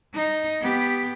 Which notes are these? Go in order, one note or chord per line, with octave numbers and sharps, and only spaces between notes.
D#4
B3 G4